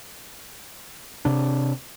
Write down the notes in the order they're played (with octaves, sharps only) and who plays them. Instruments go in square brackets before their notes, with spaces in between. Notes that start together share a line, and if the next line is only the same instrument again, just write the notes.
[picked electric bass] C3 D4